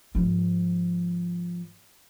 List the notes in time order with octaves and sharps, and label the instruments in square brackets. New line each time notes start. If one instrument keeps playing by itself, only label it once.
[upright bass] G#2 F3